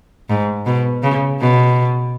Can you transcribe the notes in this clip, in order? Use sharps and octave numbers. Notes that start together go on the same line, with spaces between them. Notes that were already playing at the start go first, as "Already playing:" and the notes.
G#2
B2
C#3
B2